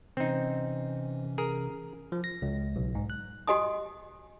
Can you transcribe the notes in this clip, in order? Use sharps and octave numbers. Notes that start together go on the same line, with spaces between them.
C3 E3 C4 C#4 D#4
G#4 A#4
F3
A#6
C#2
B1
G#2
F#6
F#4 G4 D#5 G#5 D#6